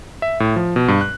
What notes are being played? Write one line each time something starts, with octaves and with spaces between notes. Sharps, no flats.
E5
A2
F3
B2
G2
F#6